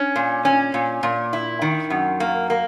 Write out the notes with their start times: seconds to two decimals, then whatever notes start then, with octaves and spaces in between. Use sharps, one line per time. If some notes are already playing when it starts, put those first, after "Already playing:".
Already playing: C#4
0.16 A#2
0.45 C#4
0.74 A#2
1.03 A#2
1.33 E4
1.62 D#3
1.90 F#2
2.20 A#3
2.50 A#3